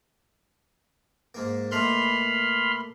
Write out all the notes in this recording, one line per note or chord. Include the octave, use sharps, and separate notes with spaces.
G#2 A#3
B2 A3 A#3 B5 C6 F6